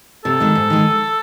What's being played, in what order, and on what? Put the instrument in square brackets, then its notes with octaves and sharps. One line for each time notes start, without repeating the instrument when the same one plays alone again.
[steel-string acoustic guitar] C3 [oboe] A4
[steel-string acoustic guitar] D#3 G#3
G#2
D#3 G#3